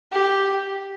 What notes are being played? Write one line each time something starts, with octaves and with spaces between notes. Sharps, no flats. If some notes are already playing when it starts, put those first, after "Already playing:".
G4